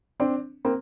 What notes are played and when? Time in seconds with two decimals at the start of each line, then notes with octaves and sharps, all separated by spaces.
0.20 C4 D4
0.65 A#3 C4